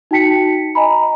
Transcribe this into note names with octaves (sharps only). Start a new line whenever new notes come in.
D#4 F#4 G5 A5 B6 C#7
D#5 G#5 A#5 B5